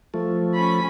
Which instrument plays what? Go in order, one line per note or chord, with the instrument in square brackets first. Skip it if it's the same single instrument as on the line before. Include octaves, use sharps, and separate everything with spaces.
[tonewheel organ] F3 A3
[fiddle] C#4 B5